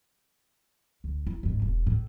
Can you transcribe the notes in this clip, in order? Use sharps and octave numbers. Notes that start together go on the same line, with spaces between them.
D2
D#4 E4
G1 G#2
E1
A2